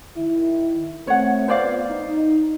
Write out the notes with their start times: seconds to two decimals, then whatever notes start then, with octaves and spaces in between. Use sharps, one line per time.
0.17 D#3 E4
1.07 A3 C4 A4 C#5 F#5
1.48 B3 F4 C5 D5 F5
1.90 D#4